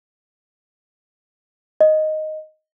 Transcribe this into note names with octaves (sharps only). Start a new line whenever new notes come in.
D#5